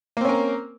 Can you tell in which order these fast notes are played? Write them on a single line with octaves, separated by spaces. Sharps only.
A#3 C4 C#4 A#4